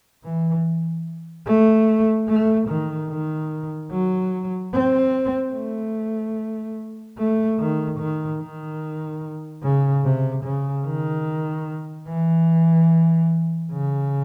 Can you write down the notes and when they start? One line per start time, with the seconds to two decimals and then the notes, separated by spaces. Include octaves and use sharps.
0.24 E3
1.46 A3
2.28 A3
2.69 D#3
3.10 D#3
3.91 F#3
4.73 C4
5.55 A3
7.18 A3
7.59 D#3
7.99 D#3
8.40 D#3
9.63 C#3
10.04 C3
10.45 C#3
10.86 D#3
12.08 E3
13.72 C#3